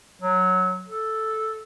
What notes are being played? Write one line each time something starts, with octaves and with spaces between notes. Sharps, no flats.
F#3
A4